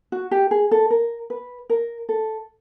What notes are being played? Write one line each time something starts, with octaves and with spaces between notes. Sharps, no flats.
F#4
G4
G#4
A4
A#4
B4
A#4
A4